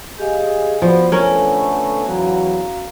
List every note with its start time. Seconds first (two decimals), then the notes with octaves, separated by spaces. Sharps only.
0.18 G4 G#4 D#5 F5
0.82 F3 B3 F#4 C5 D5
1.12 D3 A3 B3 C#4 A#4 C#5 G#5 C#6
2.06 E2 F#3 F#4 F5 A#5